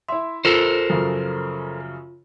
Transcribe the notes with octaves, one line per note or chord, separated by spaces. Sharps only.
E4 E5 C6
F4 A4 A#4 C5
F#2 C#3 F3